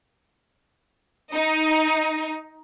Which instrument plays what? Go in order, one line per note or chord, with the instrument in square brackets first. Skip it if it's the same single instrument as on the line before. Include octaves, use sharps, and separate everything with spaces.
[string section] D#4